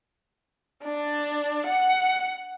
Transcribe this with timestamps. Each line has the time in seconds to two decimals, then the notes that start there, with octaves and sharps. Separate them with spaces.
0.84 D4
1.67 F#5